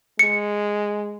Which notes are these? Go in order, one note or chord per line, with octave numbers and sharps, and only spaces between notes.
G#3 C#7